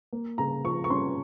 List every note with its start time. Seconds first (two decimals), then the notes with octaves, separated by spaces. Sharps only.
0.13 A#3
0.38 C#3 A#5
0.64 F3 C#6
0.84 C#6
0.90 C#4 C6